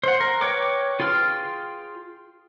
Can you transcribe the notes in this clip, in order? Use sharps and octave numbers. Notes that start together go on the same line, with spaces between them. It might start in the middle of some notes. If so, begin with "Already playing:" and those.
C5 F#5
A#4
B4 C#5 G5 D6
F4 G#4 G5 C6 F6